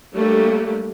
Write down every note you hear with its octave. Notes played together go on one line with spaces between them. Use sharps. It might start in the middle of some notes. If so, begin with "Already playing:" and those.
F#3 G3 A3 A#3 D4 G4